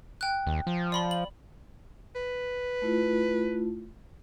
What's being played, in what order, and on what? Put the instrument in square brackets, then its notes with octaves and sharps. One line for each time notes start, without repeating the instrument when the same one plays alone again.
[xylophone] G5 F#6
[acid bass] D#2
F3
[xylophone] D5 B5 C6
F#7
[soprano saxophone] B4
[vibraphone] A3 E4 F4